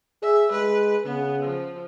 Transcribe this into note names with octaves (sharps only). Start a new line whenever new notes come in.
G#4 E5
G#3 B4
C#3 B3
F3